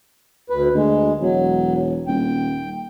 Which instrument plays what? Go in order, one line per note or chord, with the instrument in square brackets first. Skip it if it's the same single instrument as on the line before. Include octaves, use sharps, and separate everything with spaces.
[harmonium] D2 B4
[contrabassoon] D2 [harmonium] G#3
[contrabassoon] E1 [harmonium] F#3
[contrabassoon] D#1 [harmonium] G5